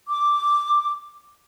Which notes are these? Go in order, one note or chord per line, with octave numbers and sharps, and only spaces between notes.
D6